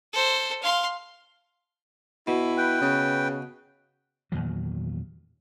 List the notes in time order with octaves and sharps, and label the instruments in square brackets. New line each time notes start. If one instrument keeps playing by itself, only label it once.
[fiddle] A4 C5
F5 C6
[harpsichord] B2 [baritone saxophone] E4
[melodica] B4 G5
[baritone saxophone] C#3
[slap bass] E2 A#2 D#3 F#3